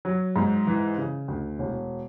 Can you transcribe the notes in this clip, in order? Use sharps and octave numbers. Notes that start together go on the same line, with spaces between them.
F#3
G#2
E3
C#3
D2
E1